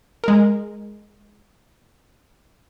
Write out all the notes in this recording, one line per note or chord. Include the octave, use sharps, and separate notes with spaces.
G#3 A#4